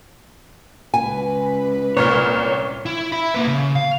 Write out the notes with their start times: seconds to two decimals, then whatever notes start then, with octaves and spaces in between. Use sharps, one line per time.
0.94 C#2 B4 G#5
1.97 C2 A#2 C#5 F6
2.86 E4
3.12 E5 B5
3.34 A#3 B4
3.47 C#3
3.76 F5